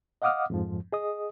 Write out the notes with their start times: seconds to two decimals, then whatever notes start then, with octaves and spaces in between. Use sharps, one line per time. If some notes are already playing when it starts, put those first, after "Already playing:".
0.22 D#5 F5 F#5 D6 D#6 F6
0.50 F2 G#2 F3
0.92 G#4 D#5 D#6